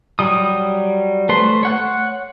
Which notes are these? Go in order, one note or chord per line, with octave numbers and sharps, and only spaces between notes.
F#3 G3 D#6
A3 B4 C5 C6
C#5 F#5 F#6